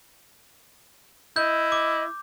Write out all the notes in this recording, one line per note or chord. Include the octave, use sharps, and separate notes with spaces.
E4 D#5 G6
D6